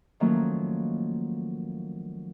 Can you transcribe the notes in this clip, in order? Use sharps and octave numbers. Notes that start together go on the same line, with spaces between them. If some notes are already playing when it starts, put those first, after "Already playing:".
D#3 F3 F#3 A3 A#3 C#4